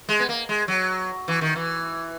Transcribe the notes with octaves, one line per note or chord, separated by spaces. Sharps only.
G#3
B3
A#3
G#3
F#3
E3
D#3
E3